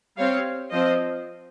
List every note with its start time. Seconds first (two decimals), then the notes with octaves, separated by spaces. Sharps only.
0.17 G3 C4 C#5 F5
0.72 F3 C4 C5 D#5